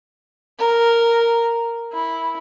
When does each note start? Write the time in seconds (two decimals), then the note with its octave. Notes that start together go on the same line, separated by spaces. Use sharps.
0.58 A#4
1.92 E4